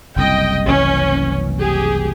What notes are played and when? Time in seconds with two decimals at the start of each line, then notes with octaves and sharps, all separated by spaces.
0.16 F#1 C2 D#5 G5
0.67 F#1 C2 E3 C#4
1.58 G4 G#4